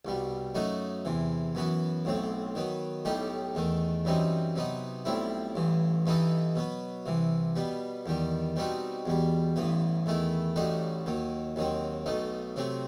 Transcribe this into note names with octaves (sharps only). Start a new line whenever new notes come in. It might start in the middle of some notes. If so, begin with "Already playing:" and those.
C2 B2 G3
F#2 F#3 A3 D#4 F#4
E2 C3 E3
F#2 E3 B3 F#4
B1 A2 F#3 C4
D#3 F#3 B3
B1 A2 G3 D#4 G4
E2 D#3 A3
F#2 E3 G3 C4 D#4
C3 F#3 B3 D#4
B1 A2 G3 C4 E4
A1 G2 E3
G2 E3 B3 D#4 A4
B2 F#3 B3
C2 C3 E3
B2 G3 B3
E2 D#3 G3
B2 G3 C4 D#4 F#4
E2 B2 G3
A1 G2 E3 B3
E2 D#3 A3 E4
A1 A2 G3 D#4 F#4
D#2 D#3 F#3
D#2 D#3 F#3 C4
B1 B2 A3 D#4
C3 F#3 A3 C4